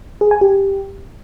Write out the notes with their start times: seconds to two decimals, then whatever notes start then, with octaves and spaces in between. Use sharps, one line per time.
0.21 G#4
0.31 G#5
0.41 G4